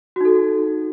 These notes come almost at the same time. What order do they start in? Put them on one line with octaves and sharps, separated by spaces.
F#4 D#4 A4